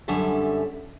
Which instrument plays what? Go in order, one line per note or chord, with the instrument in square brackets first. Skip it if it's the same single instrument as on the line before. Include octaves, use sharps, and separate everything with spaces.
[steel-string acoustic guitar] F#2 D3 G3 C#4 A4 E5